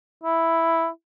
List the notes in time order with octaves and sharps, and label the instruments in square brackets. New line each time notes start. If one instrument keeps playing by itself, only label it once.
[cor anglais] E4